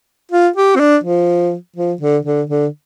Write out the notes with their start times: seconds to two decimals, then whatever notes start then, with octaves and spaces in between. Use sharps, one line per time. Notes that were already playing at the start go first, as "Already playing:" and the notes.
0.31 F4
0.56 G4
0.75 C4
0.80 D4
1.04 F3
1.76 F3
2.01 D3
2.25 D3
2.49 D3